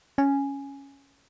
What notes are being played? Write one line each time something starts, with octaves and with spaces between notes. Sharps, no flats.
C#4 G#5